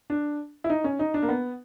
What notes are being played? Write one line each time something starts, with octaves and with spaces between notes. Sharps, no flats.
D4
E4
D#4
C#4
D#4
D4
A#3
B3